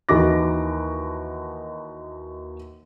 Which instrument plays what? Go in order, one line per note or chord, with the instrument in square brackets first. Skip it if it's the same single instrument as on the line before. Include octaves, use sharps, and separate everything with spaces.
[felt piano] D#2 E3 D#4 F#4 D6 A#6